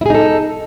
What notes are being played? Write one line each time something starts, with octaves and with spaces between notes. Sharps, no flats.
D#4 E4 G#4 A4